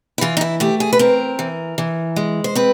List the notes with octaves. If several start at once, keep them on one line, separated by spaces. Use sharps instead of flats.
E4
E3 F4
D#4
E4
A3 G4
G#4
B4
C4 A#4
E3
E3
G#3
C5
C4 B4